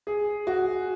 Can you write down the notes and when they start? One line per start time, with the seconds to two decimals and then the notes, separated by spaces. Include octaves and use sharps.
0.07 G#4
0.47 F#4